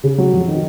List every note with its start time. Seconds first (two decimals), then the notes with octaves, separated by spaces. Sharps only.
0.04 C#3
0.18 F#3
0.33 F2
0.48 D#3